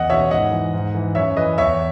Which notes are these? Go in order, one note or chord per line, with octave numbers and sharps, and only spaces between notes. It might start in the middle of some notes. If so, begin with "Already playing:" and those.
Already playing: E2 D#5 F#5
B2 C#5 E5
G#2 D#5 F#5
E3
G#2
E3
F#2 C#5 E5
E3 B4 D#5
E2 C#5 E5